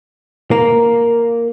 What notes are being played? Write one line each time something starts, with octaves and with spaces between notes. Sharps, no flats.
A#3